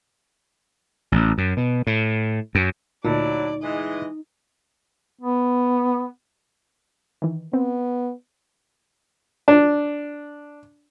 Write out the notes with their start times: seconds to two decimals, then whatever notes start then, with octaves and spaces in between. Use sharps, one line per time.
1.12 A1
1.38 F#2
1.57 B2
1.87 A2
2.55 F#2
3.05 D2 A#2 F#3 D#4 E4 D5 A5
3.63 E3 G#3 D#5
5.21 B3
7.22 D#3 E3
7.53 B3 C4
9.48 D4